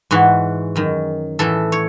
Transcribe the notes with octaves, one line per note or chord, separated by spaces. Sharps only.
G#2 E3 F#4
F#2 D#3
A2 E3 A4
C#5